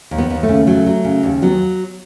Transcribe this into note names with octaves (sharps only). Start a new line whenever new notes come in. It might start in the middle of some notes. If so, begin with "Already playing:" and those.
D#2
B3
D#2
A3
C#3
F#3 A3
F#3
C#3
D#2
F#3 B3